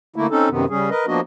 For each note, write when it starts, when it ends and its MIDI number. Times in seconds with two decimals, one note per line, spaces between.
0.16 0.27 50
0.16 0.27 57
0.16 0.27 58
0.16 0.27 64
0.30 0.49 60
0.30 0.49 61
0.30 0.49 63
0.30 0.49 69
0.49 0.65 42
0.49 0.65 48
0.49 0.65 51
0.49 0.65 59
0.69 0.90 49
0.69 0.90 55
0.69 0.90 61
0.69 0.90 68
0.90 1.06 70
0.90 1.06 71
0.90 1.06 75
1.07 1.20 53
1.07 1.20 58
1.07 1.20 59
1.07 1.20 62
1.07 1.20 66
1.07 1.20 75